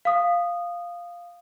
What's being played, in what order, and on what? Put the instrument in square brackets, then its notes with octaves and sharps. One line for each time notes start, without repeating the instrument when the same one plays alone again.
[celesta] F5 D#6